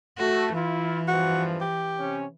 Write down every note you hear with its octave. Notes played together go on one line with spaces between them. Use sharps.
A3 F#4
E3 E4 F4
E2 G2 F3 F#4
G4
C3 C#4